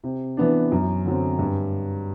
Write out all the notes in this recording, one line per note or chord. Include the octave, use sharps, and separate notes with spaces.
C3
E3 B3 D4
F#2
D3 F#3 C4
G2